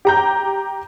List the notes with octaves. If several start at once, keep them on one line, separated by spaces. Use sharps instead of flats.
G4 A#5 G6